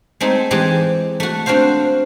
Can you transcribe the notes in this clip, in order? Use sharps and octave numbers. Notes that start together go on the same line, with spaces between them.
G#3 A3 C4 D#4
E3 G#3 C4 G4 G#4 D#5
A3 F#4
C4 D4 F#4 C5 F5